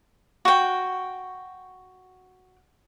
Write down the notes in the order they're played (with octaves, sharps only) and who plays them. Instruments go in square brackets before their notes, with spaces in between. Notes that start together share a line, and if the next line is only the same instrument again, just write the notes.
[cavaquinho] F#4 G5